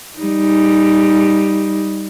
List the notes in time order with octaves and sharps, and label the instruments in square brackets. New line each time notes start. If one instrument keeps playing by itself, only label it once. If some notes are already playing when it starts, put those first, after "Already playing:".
[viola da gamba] G3 D#4